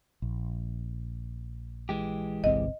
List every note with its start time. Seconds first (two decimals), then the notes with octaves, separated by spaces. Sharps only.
0.22 A#1
1.89 E3 G#3 G4
2.44 G1 C2 C4 D#5